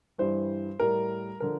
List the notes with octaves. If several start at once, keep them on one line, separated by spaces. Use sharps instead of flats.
G2 E3 G3 C5
A2 G3 A#4
D3 F3 A#4